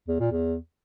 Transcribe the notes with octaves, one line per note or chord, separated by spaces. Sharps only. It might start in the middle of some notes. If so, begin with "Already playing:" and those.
E2
A#2
E2